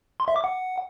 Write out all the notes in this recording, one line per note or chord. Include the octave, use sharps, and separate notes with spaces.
C6
E5
D6
F#5